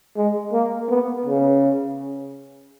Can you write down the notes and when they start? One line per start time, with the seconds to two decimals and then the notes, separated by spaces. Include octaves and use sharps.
0.16 G#3
0.52 A#3
0.90 B3
1.26 C#3